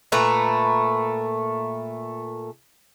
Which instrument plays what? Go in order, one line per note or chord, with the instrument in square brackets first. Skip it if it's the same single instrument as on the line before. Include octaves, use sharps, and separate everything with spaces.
[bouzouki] A#2 A3 B4 A#5